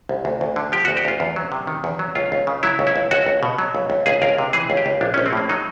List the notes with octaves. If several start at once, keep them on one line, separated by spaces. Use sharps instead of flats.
C2
D2
D2
D3
F3 G4
D2 F#4
G4
D2 F4
E2
F#3
C3
D#3
E2
F#3
C#2 F4
C#2
C#3
F#3 E4
C#2
E4
C#2
C#2 F#4
C#2
B2
F#3
C#2
C#2
C#2 G#4
C#2 A#4
C3
E3 G#4
C#2
G4
C#2
A#1 D4
A#1 C#4
C4
A2 A#3
F#3 D#4